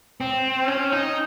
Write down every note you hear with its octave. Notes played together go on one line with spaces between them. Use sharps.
C4
C#4
D#4